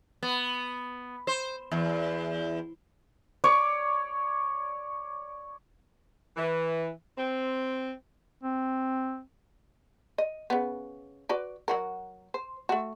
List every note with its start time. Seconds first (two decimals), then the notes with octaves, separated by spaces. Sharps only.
0.23 B3
1.27 C5
1.72 E2
3.44 C#5 D5
6.37 E3
7.18 C4
8.43 C4
10.18 D#5
10.50 C#3 B3
11.29 F#4 B4 D5
11.68 F#3 F#4 A#4
12.34 C5
12.69 A3 F#4